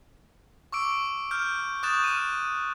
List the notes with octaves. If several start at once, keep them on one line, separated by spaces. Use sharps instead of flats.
C#6 D6 E6 D7
F6 G6
C#6 D#6 F#6 G6 A6 E7
F6 D#7